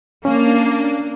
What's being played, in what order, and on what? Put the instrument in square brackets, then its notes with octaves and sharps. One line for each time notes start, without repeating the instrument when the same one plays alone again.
[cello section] A#3 D4 [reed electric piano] C#4